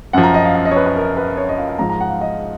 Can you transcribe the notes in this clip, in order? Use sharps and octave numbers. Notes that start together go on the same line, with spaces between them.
F#2 F3 F#5
A#5
D#5
F5
F5
D#5
C#5
B4
B4
A#4
B4
C#5
D#5
F5
F5
G#2 F3 A#5
A#5
F#5
F5
D#5